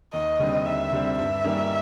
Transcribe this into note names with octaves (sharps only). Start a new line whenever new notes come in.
D#2 D#5
D3 G3 C4
D#2 E5
D3 G3 C4
G2 E5
D#3 G3 A#3 C#4